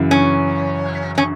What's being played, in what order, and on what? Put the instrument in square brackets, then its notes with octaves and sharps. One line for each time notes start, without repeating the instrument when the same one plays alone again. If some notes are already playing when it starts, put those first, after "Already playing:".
Already playing: [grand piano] F#2 C#3 E3
[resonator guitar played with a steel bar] C#4
C#4